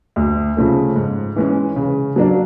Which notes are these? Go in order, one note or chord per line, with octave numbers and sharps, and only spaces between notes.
D2
C#3 F3 A3
G#2
E3 G#3 C#4
C#3
F#3 A#3 D4